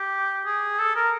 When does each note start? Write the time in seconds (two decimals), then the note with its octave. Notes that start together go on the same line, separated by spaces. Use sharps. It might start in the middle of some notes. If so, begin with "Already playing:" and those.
Already playing: G4
0.45 G#4
0.79 A4
0.96 A#4